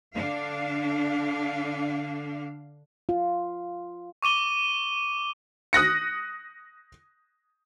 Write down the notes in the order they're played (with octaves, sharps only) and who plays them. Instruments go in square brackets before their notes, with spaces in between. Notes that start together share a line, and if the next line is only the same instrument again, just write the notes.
[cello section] D3 D4 F5
[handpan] F4
[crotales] C#6 D6 D#7 G7
[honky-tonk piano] D#6 F#6 A#6 C#7